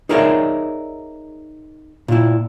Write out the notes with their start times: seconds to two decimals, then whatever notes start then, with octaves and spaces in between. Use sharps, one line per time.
0.09 D#4 G#4 A#4 C#5 D5 E5
2.08 A#2 E4